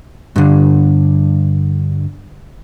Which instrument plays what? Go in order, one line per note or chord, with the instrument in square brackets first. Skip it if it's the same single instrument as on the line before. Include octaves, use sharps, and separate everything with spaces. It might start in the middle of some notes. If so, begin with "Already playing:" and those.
[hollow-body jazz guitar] G2 D3